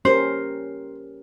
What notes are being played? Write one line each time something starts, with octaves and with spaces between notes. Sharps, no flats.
C#4 G4 A#4 C5